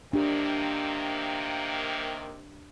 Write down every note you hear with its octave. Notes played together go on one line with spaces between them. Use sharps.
C3 D#3 A#3 D4 G4